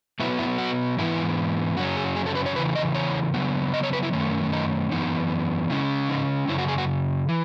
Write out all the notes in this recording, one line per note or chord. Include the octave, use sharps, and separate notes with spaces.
B2 F#3 B3 E4
E4
F#4
G#2 E3 B3 E4
F#2 C#3 F#3 C#4 F#4
G#4
G#4
A4
B4
C#5
E2 C#3 E3 B4
D#5
C#5
C#3 F#3 B3
D#5
C#5
B4
E4
F#2 D#3 A3 C#4
D#4
F#2 E3 B3 D#4
C#3 G#3 C#4 E4
D#4
F#2 C#3 F#3 E4
F#4
G#4
F#4
E3